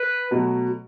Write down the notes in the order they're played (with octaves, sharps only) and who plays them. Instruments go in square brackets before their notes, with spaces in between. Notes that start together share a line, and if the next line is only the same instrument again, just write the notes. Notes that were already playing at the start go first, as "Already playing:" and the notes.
Already playing: [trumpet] B4
[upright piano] B2 F#3 A3